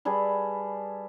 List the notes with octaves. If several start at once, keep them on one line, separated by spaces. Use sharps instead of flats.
G3 G#4 A4 B4